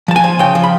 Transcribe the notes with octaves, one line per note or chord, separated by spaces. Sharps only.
F3 A5
G#5
F3
C#3 G5
F3
B5